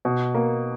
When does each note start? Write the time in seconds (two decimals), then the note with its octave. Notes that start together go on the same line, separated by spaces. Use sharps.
0.05 B2
0.34 A#3